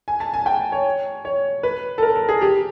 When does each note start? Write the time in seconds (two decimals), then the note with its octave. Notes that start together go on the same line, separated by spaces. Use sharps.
0.08 G#5
0.20 A5
0.34 G#5
0.46 G5
0.72 C#5
1.25 C#5
1.63 B4
1.98 A4
2.02 A#4
2.15 A4
2.29 G#4
2.41 G4